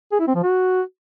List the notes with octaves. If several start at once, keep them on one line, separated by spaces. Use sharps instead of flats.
G#4
E4
C4
F3
F#4